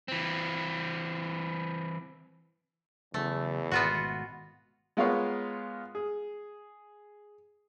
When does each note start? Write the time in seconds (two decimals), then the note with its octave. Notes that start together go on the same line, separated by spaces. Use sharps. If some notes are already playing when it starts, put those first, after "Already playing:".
0.08 E3 C4
3.14 E2 C#3 F#3 A3
3.71 G#1 B2 B3 F4 F#4
4.97 G#3 B3 F4 A#4 C#5 F5
5.95 G#4